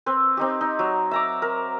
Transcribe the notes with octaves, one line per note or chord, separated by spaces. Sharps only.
C4 B4
C4 D#4 G4
D#4
F#3
E5 A#5 D6
A#4